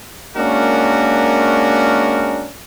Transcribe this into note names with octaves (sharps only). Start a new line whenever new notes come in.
G#3 A#3 C#4 D4 F#4 A#4